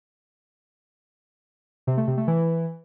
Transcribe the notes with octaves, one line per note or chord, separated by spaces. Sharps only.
C3
A3
C3
A3
E3